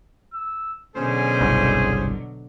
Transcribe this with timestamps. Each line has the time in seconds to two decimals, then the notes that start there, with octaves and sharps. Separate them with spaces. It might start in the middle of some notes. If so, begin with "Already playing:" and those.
0.34 E6
0.96 B2 D3 F#3 C#4 G#4 C5
1.41 G1 C2